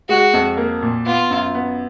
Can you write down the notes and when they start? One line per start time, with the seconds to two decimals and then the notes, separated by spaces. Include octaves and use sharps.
0.09 G#3 F#4
0.34 F2
0.57 A#3
0.82 A#2
1.06 B3 F4
1.30 F#2
1.54 B3